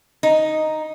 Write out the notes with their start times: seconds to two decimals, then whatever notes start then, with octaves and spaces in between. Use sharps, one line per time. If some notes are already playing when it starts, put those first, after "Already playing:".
0.23 D#4